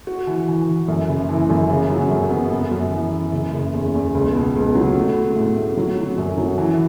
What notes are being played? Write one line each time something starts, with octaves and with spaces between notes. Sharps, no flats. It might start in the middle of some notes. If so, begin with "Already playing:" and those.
F#4
E3
E3
E3
F#2
F#1
E3
F#2
C#3
F#3
F#2
B3
F#2
F#2
E3
E4
F#1
F#1
E2
E2
C#2
B2
C#2
F#3
A3
A3
A2
A3
F#3
F#3
F#2
F#3
E3